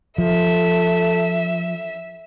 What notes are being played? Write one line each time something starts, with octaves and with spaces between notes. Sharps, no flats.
F3 A4 E5